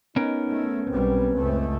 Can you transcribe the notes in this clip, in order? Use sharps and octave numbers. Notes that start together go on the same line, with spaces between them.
B3 C#4 D#4 A#4
A3
B1 G3 C4 B4
C#2 F#2 A3